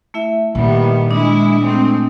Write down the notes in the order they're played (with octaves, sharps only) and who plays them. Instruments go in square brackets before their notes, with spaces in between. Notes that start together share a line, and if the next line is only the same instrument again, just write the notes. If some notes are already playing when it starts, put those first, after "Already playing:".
[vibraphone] A3 E4 E5
[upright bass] A#2 [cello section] D#3 G3 B3
[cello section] G#3 E4 [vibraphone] D4 D#6
[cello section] G#3 A3 C4